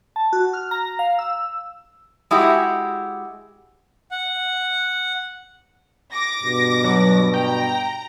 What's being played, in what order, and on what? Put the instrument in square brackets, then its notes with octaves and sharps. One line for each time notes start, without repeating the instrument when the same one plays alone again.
[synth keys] A5
F#4
F6
A#5
F5
E6
[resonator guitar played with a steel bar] G#3 E4 F#4 G4
[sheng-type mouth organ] F#5
[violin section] D6 A#6
[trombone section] G2 B2
[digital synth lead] F#3
[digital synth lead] G5 [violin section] A#5